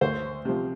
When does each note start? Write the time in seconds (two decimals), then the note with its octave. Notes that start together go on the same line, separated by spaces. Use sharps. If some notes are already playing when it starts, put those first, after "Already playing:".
0.01 D2 C5
0.45 C3 F3